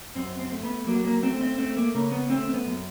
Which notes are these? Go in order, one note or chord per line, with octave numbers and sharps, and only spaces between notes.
F#2 C4
C4
A3
B3
F#3 A#3
A#3
A3 C4
C4
A3 C4
A#3
C#3 A#3
B3
A3 C4
C4
B3
F#2